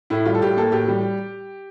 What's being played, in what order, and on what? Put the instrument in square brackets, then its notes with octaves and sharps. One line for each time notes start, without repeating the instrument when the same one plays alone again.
[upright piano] A2 E4
G3 F4
A4
A2 G4
A#3 A4
A2 G4
G3